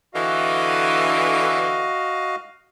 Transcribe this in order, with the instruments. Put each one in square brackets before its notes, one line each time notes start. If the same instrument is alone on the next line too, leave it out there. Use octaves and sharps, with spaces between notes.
[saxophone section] D3 E3 [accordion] F#4 D#5 F5